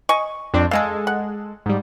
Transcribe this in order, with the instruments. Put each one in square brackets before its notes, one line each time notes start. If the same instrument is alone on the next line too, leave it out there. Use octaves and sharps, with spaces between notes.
[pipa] D#5 G#5 C#6
[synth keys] F2 C4 D4
[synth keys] G#3 A4 [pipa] G#4 D#5 F5
[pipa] F#5
[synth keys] G#2 G3